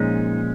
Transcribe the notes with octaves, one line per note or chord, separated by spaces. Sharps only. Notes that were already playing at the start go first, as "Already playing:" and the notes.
Already playing: A#2 F3 G#3 C#4 D#4